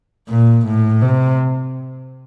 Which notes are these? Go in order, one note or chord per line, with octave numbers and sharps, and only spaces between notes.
A#2
A2
C3